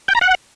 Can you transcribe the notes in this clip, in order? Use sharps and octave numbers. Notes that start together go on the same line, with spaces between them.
G5
A#5
F#5